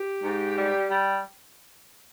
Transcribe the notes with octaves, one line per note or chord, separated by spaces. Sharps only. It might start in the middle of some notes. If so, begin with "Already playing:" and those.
Already playing: G4
G#2
G3
G3